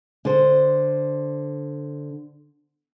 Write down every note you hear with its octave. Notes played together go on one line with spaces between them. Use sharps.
D3 C5